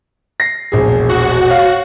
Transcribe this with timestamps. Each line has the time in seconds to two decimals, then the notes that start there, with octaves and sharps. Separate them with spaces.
0.40 A#6 C7
0.72 E1 A#1 G#4
1.09 F#4
1.48 C#5 F5